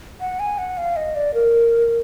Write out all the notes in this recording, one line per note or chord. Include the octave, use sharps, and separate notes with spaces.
F#5
G#5
F#5
F5
D#5
D5
A#4